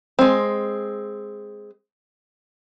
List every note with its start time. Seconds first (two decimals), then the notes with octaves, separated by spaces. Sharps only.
0.19 G#3 C4